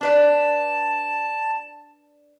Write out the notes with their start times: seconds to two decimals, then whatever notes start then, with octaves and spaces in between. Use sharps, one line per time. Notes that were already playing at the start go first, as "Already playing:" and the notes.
0.01 D4 B4 D5 A5